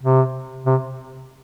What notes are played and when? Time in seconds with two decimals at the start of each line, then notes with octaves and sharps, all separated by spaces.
0.03 C3
0.66 C3